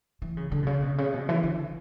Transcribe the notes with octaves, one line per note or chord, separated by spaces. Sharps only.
E3
C#3
D3
B2
C#3
B2
C#3
B2
E3
D3